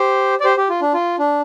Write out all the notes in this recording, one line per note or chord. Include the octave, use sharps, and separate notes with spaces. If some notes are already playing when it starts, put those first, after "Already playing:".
Already playing: G4 C5
D5
G4 C5
G4
F4
D4
F4
D4